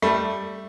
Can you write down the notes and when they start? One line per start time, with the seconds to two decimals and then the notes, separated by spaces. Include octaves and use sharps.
0.02 G3 A3